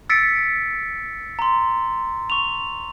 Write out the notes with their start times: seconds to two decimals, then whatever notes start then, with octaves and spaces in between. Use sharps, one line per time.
0.10 E6 A6 B6 C#7 D7
1.39 A#5 C6
2.30 C#6 F7